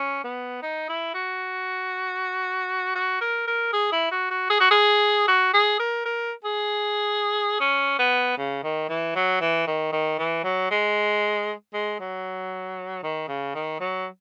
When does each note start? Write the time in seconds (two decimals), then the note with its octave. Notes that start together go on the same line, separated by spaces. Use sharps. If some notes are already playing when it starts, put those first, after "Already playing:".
Already playing: C#4
0.24 B3
0.63 D#4
0.89 E4
1.15 F#4
2.95 F#4
3.21 A#4
3.48 A#4
3.73 G#4
3.92 E4
4.12 F#4
4.31 F#4
4.50 G#4
4.61 F#4
4.71 G#4
5.28 F#4
5.54 G#4
5.80 A#4
6.06 A#4
6.44 G#4
7.60 C#4
7.99 B3
8.38 C#3
8.64 D#3
8.89 E3
9.16 F#3
9.41 E3
9.67 D#3
9.93 D#3
10.19 E3
10.44 F#3
10.71 G#3
11.74 G#3
12.00 F#3
13.03 D#3
13.28 C#3
13.55 D#3
13.80 F#3